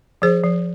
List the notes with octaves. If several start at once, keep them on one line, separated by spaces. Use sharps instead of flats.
F3 G#4 C5
F3